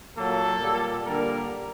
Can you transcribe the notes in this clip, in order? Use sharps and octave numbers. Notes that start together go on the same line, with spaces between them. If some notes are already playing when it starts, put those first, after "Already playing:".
A#2 F#3 A#3 A4
A#2 G3 A#3
D3 G3 A#3 A#4